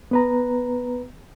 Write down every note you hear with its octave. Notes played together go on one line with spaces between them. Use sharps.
B3 B4 A#5